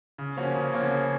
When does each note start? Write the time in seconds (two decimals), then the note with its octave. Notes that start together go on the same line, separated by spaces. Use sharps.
0.18 C#3
0.36 F3 A#3 C#4 F#4
0.55 C#3
0.73 F3 A#3 C#4 F#4
0.91 C#3